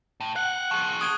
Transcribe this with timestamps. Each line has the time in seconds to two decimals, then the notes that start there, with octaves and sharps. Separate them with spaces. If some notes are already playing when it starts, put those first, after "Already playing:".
0.20 A2
0.36 F5 F#5 F#6
0.71 F3 G#4 C#6
1.01 D#6 G#6 G7